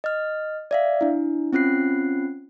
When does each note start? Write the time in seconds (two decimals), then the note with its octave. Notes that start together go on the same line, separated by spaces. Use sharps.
0.04 D#5 F6
0.71 D5 E5 F5
1.01 D4 E4
1.53 C4 C#4 F4 F#6 C7